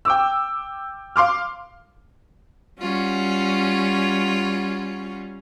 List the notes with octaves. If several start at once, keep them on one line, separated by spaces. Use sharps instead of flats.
G5 D6 E6
F5 C6 D6 F6
G3 C#4 F4 F#4